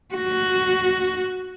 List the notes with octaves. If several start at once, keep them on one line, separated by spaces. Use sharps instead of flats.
F#4